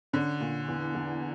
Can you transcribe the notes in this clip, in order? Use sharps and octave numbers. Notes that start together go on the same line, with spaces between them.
D3 C#4
A#2
E2
E2